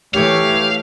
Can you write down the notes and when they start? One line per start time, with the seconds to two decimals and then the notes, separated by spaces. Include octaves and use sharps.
0.14 E3 A3 G4 C#5 F5